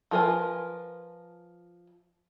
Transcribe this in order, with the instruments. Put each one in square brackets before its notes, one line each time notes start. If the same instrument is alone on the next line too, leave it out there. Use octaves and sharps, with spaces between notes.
[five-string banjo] F3 F4 A#4 B4 G#5